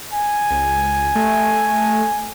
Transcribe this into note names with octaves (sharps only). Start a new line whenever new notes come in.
G#5
C#2
A3